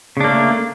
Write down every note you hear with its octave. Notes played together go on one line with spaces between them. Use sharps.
C#3 A3 A#3 D4